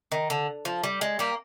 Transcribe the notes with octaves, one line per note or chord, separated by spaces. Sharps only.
D#3
D3
F3
G3
G#3
G3 A#3